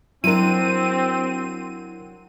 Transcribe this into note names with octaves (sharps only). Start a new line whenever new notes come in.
F#3 C4 D4 E4 A#4 D#7